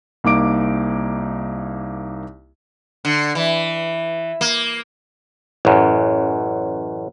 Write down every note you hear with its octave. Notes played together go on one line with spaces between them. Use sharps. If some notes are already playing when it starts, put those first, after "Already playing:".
C2 A#3 D#4 D6 D7
D3
E3
A#3
A1 F#2